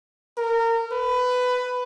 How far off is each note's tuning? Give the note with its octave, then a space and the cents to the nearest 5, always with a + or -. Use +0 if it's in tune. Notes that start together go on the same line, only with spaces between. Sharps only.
A#4 -25
B4 +15